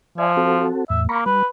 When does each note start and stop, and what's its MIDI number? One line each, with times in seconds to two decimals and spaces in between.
0.18 0.67 53
0.18 0.32 74
0.18 0.32 76
0.18 0.32 80
0.37 0.85 60
0.37 0.85 66
0.37 0.85 69
0.90 1.08 40
0.90 1.08 45
0.90 1.02 76
1.09 1.25 58
1.09 1.21 82
1.09 1.21 83
1.09 1.21 85
1.26 1.43 55
1.26 1.46 71